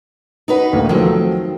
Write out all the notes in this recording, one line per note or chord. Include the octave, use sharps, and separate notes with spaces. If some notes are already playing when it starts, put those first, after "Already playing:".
D#4 F#4 B4
D2 A2 A#3
D#3 F3 F#3 A3 C4